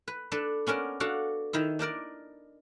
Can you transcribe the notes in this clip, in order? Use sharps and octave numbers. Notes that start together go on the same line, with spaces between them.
B4
D4 A4 B4
B3 C#4 D4 A#4
D4 F#4 A4 F5
D#3 D#4 E4
D4 D#4 A#4 D5